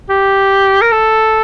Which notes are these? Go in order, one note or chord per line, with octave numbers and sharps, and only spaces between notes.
G4
A#4
A4